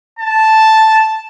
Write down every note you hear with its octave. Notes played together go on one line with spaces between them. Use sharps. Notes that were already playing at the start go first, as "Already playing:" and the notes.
A5